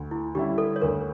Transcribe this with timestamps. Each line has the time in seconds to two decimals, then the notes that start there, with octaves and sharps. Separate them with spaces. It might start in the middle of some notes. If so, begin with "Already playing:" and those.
Already playing: D2
0.11 E4
0.35 D3 G3 C#4 E4 G4
0.58 A4
0.76 C#5
0.81 D2 A#4